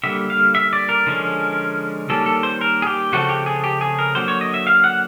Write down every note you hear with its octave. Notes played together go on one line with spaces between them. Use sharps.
D3 G3 A#3 E5
F5
E5
D5
A#4
D3 F3 G#3 C#4
D#3 G3 A#3 C#4 A4
A4
C5
A#4
G#4
G4
C#3 F3 A3 C4 F#4
G4
G#4
G4
G#4
A#4
D3 F#3 A#3 C5
C#5
D#5
E5
F5
F#5